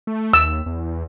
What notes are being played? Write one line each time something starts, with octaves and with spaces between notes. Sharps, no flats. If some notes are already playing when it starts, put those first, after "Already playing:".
A3
D#2 E6
E2